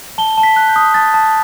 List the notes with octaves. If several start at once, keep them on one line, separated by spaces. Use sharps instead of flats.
A5 G7
A5
B6
F#6
G6
D#6
A5 A6
A5